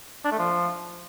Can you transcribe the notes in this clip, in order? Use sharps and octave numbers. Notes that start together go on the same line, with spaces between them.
D4
A3
F3